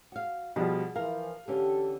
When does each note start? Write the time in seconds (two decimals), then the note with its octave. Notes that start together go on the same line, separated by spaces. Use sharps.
0.12 F#4 F5
0.56 B2 F3 G3 G#4 F#5
0.96 E3 F3 A#4 F5
1.48 D3 E3 C#4 G4 A4